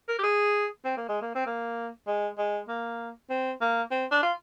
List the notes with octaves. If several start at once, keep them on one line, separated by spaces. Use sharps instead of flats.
A#4
G4
G#4
C4
A#3
G#3
A#3
C4
A#3
G#3
G#3
A#3
C4
A#3
C4
D4
F4